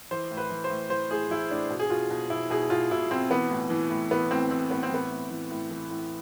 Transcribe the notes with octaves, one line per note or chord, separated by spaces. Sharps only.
E3 C5
A2
B4
E3
C5
A2
E3 C5
A2 G#4
E3 E4
A2 D4
B2
G#4
B2 F4
B2
B2 E4
B2 G#4
B2 F4
B2 E4
B2 C4
E3 B3
A2
E3
A2
E3 B3
A2 C4
E3 C4
A2 B3
C4
E3 B3
A2
E3
A2
E3
A2